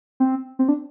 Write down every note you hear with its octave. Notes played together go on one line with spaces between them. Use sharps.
C4
C4
D4